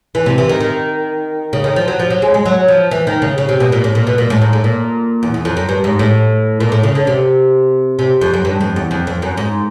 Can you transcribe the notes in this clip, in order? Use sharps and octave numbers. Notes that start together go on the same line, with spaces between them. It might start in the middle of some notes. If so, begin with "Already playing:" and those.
E3
C3
E3
D#3
D#3
C#3
D#3
F3
F#3
F3
F#3
G#3
G#3
F#3
F3
E3
D#3
C#3
C#3
C3
B2
A#2
A2
A#2
B2
A#2
A2
G#2
A2
A#2
E2
E2
F2
F#2
G2
G#2
A2
A#2
A2
C#3
D3
C3
C3
F2
F#2
G2
F2
E2
F2
F2
F#2
G#2